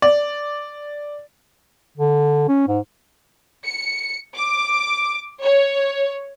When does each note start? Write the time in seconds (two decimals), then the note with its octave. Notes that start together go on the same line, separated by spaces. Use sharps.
0.02 D5
1.98 D3
2.48 C#4
2.68 G#2
3.65 C#7
4.36 D6
5.41 C#5